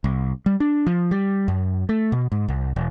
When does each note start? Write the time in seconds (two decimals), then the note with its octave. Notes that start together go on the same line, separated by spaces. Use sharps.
0.04 C2
0.46 G3
0.60 D4
0.87 F3
1.11 G3
1.48 F#2
1.89 A3
2.12 B2
2.32 G#2
2.48 C2
2.76 E1